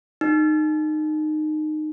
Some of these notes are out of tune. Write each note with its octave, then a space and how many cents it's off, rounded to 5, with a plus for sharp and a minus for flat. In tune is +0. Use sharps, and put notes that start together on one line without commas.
D#4 -20